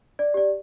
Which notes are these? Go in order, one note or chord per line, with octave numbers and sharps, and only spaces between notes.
D5
G4 D5